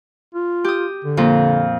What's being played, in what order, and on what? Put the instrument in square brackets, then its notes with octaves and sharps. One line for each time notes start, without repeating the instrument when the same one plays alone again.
[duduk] F4
[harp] G4 D#6
[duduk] D3
[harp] F2 A#2